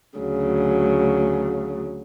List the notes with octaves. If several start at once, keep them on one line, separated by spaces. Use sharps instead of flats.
D2 C#3 F#3